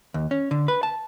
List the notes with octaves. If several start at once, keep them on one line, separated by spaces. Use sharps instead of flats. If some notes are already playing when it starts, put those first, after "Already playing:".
D#2
C#4
D3
B4
A5